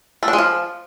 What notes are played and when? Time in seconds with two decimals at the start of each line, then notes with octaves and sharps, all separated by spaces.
0.23 A3
0.28 D4
0.33 G#3
0.38 F3